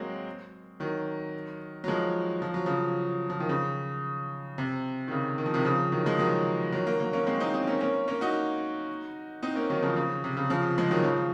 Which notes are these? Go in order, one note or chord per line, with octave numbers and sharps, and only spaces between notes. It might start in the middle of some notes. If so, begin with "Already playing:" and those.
Already playing: F#3 G#3 A#3 C4
D#3 F#3
F#3
F3 G#3
F3
F#3
C#3 F3
F3
D#3
C#3
C3
D#3
C#3
D#3
F3
C3 D#3
C#3 F3
D#3 F#3
F3 G#3
D#3 F#3
D#3 F#3
F#3 A#3
F#3 A#3
A#3 C#4
G#3 C4
C4 D#4
C4 D#4
A#3 C#4
A#3 C#4
A#3 C#4
D#4 F#4
C4 D#4
A#3 C#4
D#3 F#3
C#3 F3
C#3
C3
C#3
C#3 F3
F3 G#3
D#3 F#3
C#3 F3